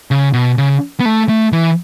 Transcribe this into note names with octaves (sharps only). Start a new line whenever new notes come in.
C#3
B2
C#3
B3
A3
A3
E3